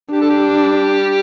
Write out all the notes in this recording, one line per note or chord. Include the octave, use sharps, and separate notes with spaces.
D4 G4
A4
G3 G4